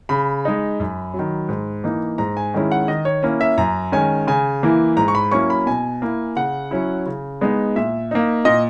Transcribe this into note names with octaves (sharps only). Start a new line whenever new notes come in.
C#3 B5
G#3 D#4
F#2
F#3
D#3
G#2
E3 A#3 D#4
G#2 A#5
G#5
D#3 G#3 C#4 E4
F#5
D#3 D#5
C#5
A#3 C#4 E4
E5
F#2 A#5
D#3 G#3 C#4 G#5
C#3 G#5
E3 A#3 E4
G#2 A#5
C#6
B5
F#3 A#3 C#4 E4 C#6
B5
B2 G#5
A#3 E4
C#3 F#5
F#3 C#4 E4
C#3
G#3 B3 D#4
A#2 E5
A#3 D#4
A#2 D#5